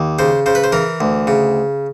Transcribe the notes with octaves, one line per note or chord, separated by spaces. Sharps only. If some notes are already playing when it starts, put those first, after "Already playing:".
Already playing: D#2
C#3 C5
C#3 C5
B4
C5
E3 A#4
D2
C#3